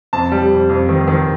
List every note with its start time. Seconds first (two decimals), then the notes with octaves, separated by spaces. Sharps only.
0.13 F2 A5
0.32 G3
0.51 F2
0.69 F2
0.89 D#3
1.08 D#3